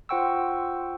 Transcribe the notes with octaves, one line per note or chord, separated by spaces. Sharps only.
F4 C5 F#5 G5 C#6 E6